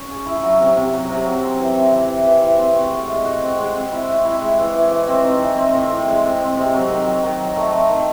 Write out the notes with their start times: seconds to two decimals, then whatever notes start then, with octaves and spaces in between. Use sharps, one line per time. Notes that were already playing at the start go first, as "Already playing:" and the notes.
Already playing: C#4
0.10 G#4
0.26 E4
0.43 F#3
0.60 C3
0.77 C3
0.93 F#3
1.09 C3
1.25 F#3
1.43 C4
1.60 E3
1.76 C4
1.93 E3
2.09 E3
2.26 E3
2.42 E3
2.59 C4
2.75 F#4
2.91 A2
3.09 G#3
3.24 F#4
3.42 C4
3.58 G#3
3.75 C4
3.92 E4
4.08 C4
4.25 E4
4.41 G#3
4.58 E3
4.74 E3
4.90 E3
5.08 C4
5.24 D#4
5.40 E3
5.57 C4
5.74 A2
5.90 A2
6.08 G#3
6.23 C4
6.40 C4
6.57 C3
6.74 F#3
6.90 D#3
7.06 F#3
7.24 D#3
7.40 F#3
7.56 A3
7.73 C4
7.90 D#3